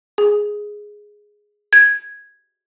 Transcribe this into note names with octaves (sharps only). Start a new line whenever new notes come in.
G#4
G#6